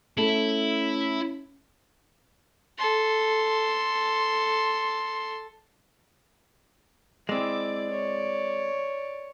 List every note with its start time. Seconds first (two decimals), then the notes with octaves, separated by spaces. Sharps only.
0.18 A3 C#4 E4
2.78 A4 C6
7.29 G#3 C4 E4 D5 D6
7.90 C#5